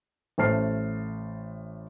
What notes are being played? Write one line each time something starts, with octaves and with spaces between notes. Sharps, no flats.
A1 A3 C5 A5 F6 C7